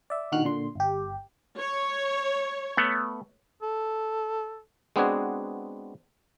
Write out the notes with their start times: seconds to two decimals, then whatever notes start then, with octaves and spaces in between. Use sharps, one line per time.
0.10 D5 E5
0.32 A#2 D3 D#3 F#4 F6 F#6
0.44 A#2 D3 C6
0.75 G1 G4
1.58 C#5
2.77 A3 B3
3.62 A4
4.96 G#3 B3 C4 D4 F#4 G#4